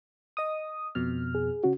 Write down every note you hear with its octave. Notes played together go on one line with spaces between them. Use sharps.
D#5 D#6
F2 B2 F6
G#4
C#3 C#4 F#4